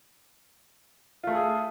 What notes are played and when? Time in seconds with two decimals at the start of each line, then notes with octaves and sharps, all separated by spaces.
1.23 F4
1.27 A3
1.31 A4
1.35 G#4